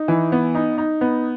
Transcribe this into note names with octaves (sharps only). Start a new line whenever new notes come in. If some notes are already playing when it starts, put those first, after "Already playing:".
Already playing: D#4
E3
B3
D#4
D#4
B3